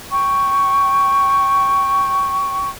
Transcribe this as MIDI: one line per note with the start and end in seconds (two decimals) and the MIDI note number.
0.11 2.68 79
0.11 2.68 85